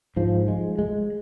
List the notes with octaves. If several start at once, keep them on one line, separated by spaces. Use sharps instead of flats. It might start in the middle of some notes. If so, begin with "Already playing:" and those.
G#2 F3
G#3
G#3